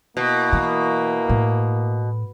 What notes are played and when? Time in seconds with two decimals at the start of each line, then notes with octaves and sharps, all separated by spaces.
0.17 B2 A#3 E4
0.53 E3
1.29 A2